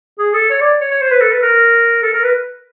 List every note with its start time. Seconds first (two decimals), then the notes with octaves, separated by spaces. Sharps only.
0.19 G#4
0.34 A4
0.50 C#5
0.61 D5
0.81 C#5
0.91 C#5
1.01 C5
1.11 B4
1.21 A4
1.32 B4
1.42 A#4
2.03 A4
2.13 A#4
2.24 B4